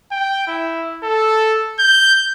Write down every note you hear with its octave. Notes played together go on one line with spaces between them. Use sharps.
G5
E4
A4
G6